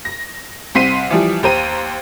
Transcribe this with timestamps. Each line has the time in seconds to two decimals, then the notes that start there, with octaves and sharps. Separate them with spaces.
0.05 A#6
0.75 C2 C4 C6 B6 C7 D#7
1.11 E3 F3 G3
1.43 D#2 G4 C5 A#5 D#7